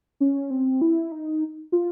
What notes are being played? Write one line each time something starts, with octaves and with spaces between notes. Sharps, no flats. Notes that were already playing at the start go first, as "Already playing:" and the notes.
C#4
C4
E4
D#4
F4